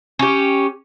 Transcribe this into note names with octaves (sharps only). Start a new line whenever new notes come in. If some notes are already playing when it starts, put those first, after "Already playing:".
C#4 G4